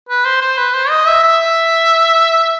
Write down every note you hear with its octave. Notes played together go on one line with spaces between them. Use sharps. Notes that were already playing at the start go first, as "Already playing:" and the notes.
B4
C5
C5
B4
C5
D#5
E5
E5